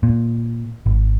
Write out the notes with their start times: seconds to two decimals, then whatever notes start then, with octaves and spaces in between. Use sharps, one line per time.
0.03 A#2
0.86 G#1